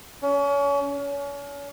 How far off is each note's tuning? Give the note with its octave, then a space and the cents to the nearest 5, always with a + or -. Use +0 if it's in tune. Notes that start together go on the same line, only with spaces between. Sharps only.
C#4 +35
C#4 +35